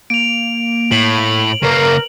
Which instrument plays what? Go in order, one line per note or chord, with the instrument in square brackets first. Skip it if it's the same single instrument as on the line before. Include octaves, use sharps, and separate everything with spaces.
[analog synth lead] A#3 [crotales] D7 F7
[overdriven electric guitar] A2 [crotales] F#7
[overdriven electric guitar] C#3 A#3 [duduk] A#4 [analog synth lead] B4